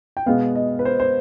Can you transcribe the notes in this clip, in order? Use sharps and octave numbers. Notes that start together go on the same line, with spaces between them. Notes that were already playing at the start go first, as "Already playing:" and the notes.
G5
B2 G#3 B3 F5
D#5
B4
C5
C5